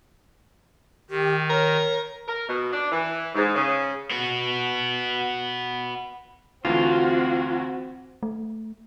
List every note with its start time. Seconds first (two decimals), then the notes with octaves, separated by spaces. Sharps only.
1.10 D#3 G4
1.50 A#4 C#5
2.28 A#4
2.48 B2
2.73 D4
2.92 E3
3.35 G#2
3.55 C#3
4.11 B3 F#4
6.65 D2 E3 A3 C4 F4 F#4
8.23 A3